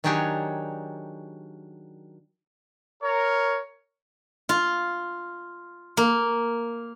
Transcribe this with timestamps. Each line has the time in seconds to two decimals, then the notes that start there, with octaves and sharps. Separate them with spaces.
0.04 D#3 F#3 D4 G4 G#4 C#5
3.03 A#4 C#5
4.49 F4
5.97 A#3